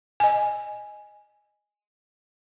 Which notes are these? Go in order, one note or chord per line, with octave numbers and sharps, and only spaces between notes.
D#5 G#5